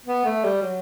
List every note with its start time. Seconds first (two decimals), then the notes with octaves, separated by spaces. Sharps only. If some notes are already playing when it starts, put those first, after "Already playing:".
0.06 B3
0.25 A3
0.44 G3
0.62 F#3